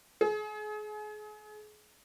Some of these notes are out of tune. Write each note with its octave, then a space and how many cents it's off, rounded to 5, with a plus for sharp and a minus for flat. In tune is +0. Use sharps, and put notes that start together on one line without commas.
G#4 +35